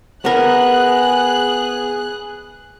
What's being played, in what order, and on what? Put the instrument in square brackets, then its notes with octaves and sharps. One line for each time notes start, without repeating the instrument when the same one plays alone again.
[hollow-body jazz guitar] B3 A#4 [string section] G#4 F#6